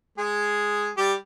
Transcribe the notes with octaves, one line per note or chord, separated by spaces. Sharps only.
G#3 G#4
G3 G4